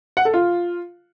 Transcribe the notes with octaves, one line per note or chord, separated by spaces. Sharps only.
F#5
A4
F4